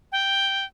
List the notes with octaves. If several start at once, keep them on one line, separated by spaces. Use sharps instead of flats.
G5